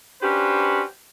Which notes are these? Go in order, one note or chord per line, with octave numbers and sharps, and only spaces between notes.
C#4 D4 F#4 G4 B4 C5